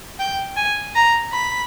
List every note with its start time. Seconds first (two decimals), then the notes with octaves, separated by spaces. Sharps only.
0.19 G5
0.57 G#5
0.96 A#5
1.33 B5